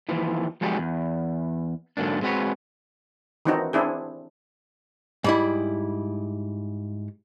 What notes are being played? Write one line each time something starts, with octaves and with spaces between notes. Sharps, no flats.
D#2 E3 F3
F3 G#3 D#4 F#4 G4
E2
G#2 D3 F#3 A#3 D4
G#3 C4 F#4 B4 C#5
D#3 E3 C4 D4 D#4 F#4
C4 D4 E4 G#4
G#2 G3 E4